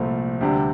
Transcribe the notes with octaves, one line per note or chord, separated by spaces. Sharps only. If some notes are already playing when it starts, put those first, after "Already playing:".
Already playing: C2 A#2 F3 A3 C4
D2 C3 G3 D4 G4